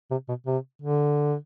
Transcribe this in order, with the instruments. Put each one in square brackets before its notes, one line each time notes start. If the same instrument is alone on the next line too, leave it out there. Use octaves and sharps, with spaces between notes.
[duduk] C3
B2
C3
D3